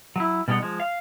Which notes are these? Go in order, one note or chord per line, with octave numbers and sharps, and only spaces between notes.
F#3 E4
B2 G3 G#3 C#4 D#4 F#5
F3 G#3
F5